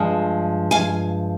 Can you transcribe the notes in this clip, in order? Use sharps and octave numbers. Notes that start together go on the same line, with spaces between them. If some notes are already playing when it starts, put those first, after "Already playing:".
Already playing: G2 F3 G#3
F5 G#5